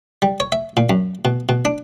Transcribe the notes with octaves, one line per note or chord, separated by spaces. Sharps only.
G3
C#5
E5
A#2
F#2
B2
B2
D4